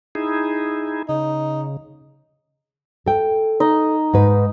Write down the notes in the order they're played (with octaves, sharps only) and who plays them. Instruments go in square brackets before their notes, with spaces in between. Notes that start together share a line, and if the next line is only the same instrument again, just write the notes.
[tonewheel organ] D#4 E4 G#4
[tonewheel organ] C#3 [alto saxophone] D#4
[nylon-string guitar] A4 G5
[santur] D#4 D#5
[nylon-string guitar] G#2 B4